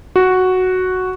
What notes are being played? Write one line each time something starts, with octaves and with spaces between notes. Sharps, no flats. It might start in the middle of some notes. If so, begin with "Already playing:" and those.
F#4